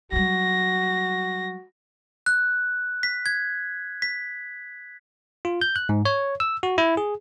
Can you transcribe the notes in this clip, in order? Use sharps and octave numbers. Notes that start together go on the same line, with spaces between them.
F#3 G3 F#4 A#6
F#6
B6
G#6
B6
F4
G6
F#6
G#2
C#5
E6
F#4
E4
G#4